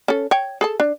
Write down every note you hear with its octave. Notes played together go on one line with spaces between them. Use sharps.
C#4 A4
C#5 G5
G#4 A4 A5
D4